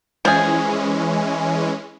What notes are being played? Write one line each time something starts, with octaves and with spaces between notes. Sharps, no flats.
E3 F3 G#3 C#4 G#4